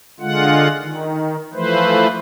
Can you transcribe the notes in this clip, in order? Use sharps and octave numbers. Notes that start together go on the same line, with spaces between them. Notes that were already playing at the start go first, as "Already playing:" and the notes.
D3 G#3 F4 F#5
D#3
E3 F3 A3 B4 C5